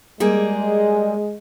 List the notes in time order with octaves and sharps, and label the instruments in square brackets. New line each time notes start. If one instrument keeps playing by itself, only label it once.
[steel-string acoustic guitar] G3 A#3 G#4 [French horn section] G#3